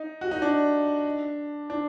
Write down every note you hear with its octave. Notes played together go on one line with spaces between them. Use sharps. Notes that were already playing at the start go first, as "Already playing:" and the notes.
Already playing: D#4
F#4
D#4
D4
D4